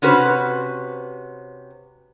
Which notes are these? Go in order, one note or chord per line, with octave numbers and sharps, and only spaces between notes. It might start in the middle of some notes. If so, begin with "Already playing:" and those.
C3 C#4 F#4 B4 C5